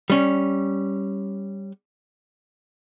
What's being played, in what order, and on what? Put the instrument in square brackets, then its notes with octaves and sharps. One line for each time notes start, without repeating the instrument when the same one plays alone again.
[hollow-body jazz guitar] G3 C#4